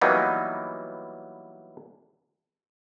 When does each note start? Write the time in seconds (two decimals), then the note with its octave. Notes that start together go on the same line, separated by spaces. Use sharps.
0.01 E3 F#3 G3 A#3 B3 D#4